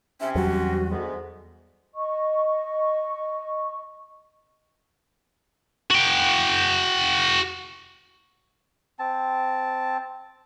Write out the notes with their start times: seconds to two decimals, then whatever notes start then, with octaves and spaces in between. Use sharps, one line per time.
0.20 C3 C4 C#4 E5
0.35 E2 F#3 G3 F#4
0.90 D2 G#2 B3
1.94 D#5 C#6
5.90 F#4 G5
8.99 C4 A5